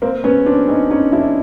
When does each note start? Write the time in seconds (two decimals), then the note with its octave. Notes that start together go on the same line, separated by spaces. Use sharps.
0.02 A#3 C4
0.24 B3 C#4
0.46 C4 D4
0.68 C#4 D#4
0.90 C#4 D#4
1.12 D4 E4